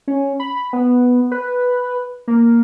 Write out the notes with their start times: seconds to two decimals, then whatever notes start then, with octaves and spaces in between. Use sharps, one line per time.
0.08 C#4
0.40 B5
0.73 B3
1.32 B4
2.28 A#3